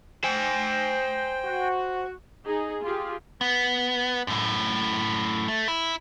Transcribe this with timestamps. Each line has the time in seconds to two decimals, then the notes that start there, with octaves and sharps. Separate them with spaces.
0.24 C5 G5 G#5
1.44 F#4
2.45 D#4 G#4
2.84 F4 G4 G#4
3.41 B3
4.27 F#2 A2
5.48 A3
5.68 E4